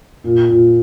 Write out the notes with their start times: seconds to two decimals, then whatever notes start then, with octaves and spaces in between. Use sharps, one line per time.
0.24 A#2
0.49 A#2